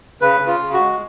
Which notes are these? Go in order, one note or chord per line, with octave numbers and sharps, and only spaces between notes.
C#3 B4
C#3
F4
C#3
F#4
G#3